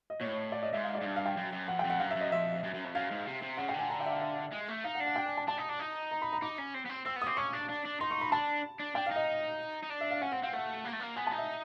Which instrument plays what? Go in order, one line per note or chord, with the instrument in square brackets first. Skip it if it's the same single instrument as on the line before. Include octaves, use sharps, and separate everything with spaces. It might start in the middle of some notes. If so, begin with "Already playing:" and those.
[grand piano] D#5
[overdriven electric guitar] A#2 [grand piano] C#5
[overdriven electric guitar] A2
[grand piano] C#5
D5
D#5
[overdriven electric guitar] G#2 [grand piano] E5
[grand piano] F5
D5
[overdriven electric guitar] G#2
G2
[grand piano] F5
G5
[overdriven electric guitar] F#2
F#2
[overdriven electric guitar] F2 [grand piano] F#5
[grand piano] G5
[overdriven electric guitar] F2
[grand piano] F#5
[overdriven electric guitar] F#2 [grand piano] F5
[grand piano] E5
[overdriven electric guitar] F#2
[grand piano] D#5
[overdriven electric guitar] F2 [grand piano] E5
[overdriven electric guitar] F#2
F#2
F2
[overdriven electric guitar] F#2 [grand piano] F5
[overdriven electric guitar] G#2
C3
C3
[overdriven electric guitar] C#3 [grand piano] F#5
[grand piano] G5
[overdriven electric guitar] D3
[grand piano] G#5
A#5
G5
E5
F5
E5
[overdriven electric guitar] G#3
A3
[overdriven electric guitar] D#4 [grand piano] F5
[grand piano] F#5
[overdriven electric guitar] D4
[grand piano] F#5
G5
G#5
A5
[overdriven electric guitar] D4 [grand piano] A5
[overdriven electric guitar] D#4
D4
D#4
[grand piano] A#5
B5
A#5
[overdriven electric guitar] D#4 [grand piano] D6
[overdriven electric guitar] C#4
C4
B3
C4
[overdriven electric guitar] C4 [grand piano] E6
[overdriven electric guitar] B3
[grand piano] D#6
[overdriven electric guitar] C4 [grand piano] D6
[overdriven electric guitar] C#4 [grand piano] C#6
[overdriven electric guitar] D4
D4
D4
[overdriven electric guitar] D#4 [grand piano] C6
[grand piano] C#6
B5
[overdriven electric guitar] D4 [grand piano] A5
[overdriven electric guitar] D4
[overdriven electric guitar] D4 [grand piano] G5
[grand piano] F5
[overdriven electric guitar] D#4 [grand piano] D#5
[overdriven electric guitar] D#4
D4
[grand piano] E5
F5
[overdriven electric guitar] C#4 [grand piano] F#5
[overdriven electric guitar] C4 [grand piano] F#5
[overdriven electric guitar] C4 [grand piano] F5
[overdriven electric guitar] A3 [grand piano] F#5
[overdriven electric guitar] A#3
A3
A#3
[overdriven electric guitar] B3 [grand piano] G#5
[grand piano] A5
[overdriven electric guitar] D#4
[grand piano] E5